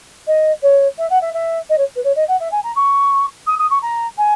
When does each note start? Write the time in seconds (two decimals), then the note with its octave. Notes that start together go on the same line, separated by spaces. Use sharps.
0.27 D#5
0.62 C#5
0.98 E5
1.10 F#5
1.21 E5
1.33 E5
1.69 D#5
1.77 C#5
1.95 B4
2.04 C#5
2.15 D#5
2.28 F#5
2.40 E5
2.51 G#5
2.63 A#5
2.75 C#6
3.46 D#6
3.58 D#6
3.70 C#6
3.82 A#5
4.17 G#5